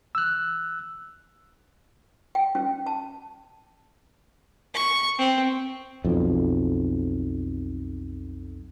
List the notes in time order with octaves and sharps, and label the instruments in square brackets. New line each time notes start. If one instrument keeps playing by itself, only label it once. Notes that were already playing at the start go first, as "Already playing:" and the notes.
[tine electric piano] E6 F#6
[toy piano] G5
C#4
A5
[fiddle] C#6
C4
[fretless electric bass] B1 F2